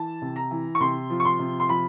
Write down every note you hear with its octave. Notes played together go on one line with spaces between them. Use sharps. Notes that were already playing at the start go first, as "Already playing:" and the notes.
Already playing: E3 A5
C3
A#5
E3
C#6
C3 C6
F3
C#6
C6
C3
C6
F3 B5